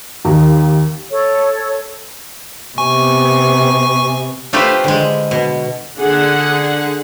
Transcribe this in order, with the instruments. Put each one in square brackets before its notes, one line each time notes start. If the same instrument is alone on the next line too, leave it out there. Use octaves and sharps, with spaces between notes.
[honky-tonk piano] D#2
[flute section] A4 C#5
[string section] C3 B3 [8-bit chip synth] G#5 C#6
[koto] A3 F4 G4 B4 C5 G5
D3 G#3
B2
[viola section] D3 G#4 F#5